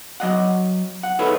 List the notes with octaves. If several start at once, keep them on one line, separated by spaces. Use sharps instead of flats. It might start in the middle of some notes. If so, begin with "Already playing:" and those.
F#3 D#5 F#5
F#5
D#4 G#4 A4 B4 C#5 E5